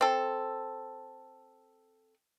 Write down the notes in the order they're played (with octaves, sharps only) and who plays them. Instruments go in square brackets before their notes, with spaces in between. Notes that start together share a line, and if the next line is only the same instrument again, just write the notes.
[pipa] C4 A4